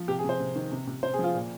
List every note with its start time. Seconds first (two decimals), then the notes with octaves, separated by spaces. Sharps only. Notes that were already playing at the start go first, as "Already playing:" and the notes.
Already playing: F3
0.08 C3 G4
0.19 G#4
0.24 C3 C5
0.40 C3
0.56 D#3
0.72 C3
0.87 C3
1.03 C3 C5
1.14 G#4
1.19 F3
1.24 F4
1.34 A#2